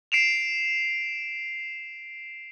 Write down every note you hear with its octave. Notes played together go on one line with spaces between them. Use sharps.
C7 D7 E7 F7